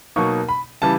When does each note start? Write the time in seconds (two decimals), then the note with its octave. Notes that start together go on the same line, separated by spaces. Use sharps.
0.16 B2 F#3 A#3 D#4 C#6
0.49 B5
0.82 C#3 E3 G3 A5